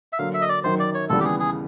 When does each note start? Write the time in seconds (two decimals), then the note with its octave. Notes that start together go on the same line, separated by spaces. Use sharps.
0.13 E5
0.19 D3 F#3 A#3 F5
0.34 E5
0.42 D#5
0.49 D5
0.64 F#2 D#3 F#3 C5
0.80 D5
0.95 C#5
1.09 D#2 C#3 E3 G3 B3 A4
1.20 G4
1.25 G#4
1.40 G#4